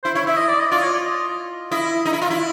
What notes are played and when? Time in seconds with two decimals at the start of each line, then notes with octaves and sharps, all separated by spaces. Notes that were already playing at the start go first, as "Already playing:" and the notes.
0.04 E4 C5
0.15 E4 C#5
0.27 E4 E5
0.37 D#5
0.49 D5
0.60 D#5
0.71 F4 D5
0.82 C#5
0.93 D5
1.05 D#5
1.71 E4 D#5
2.05 D#4
2.13 E4
2.22 F4
2.30 E4